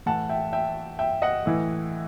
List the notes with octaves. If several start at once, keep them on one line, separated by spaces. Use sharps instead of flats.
A2 E3 F#5 A5
E5 G5
E5 G5
E5 G5
D#5 F#5
A2 E3